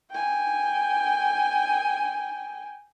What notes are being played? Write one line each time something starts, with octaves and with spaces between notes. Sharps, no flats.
G5 G#5